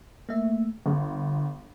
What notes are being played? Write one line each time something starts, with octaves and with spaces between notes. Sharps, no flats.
A3 A#3 E5
G1 D3